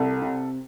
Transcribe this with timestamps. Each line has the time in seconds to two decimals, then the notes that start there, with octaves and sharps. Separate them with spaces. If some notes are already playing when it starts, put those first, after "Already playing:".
Already playing: C2 A4
0.22 C3